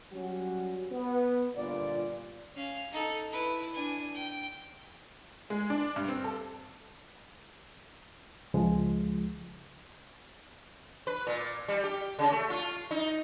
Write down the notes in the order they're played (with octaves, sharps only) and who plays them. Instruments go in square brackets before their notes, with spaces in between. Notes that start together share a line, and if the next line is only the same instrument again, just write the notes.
[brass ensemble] F#3 G3 C#4 F#4
B3
G1 A#2 F4 D5
[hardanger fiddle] C#4 F5
D#4 A4
E4 B4
D4 G#5
G5
[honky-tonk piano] G#3
D4
G2
C4
A4
[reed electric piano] C#2 F3 G#3
[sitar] B4
A#2
G3
G4
C#3
A3
F4
D#4